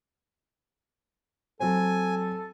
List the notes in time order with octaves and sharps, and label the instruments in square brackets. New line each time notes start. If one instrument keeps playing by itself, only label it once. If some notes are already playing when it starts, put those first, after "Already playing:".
[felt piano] F#3 C4 [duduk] A4 [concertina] G#5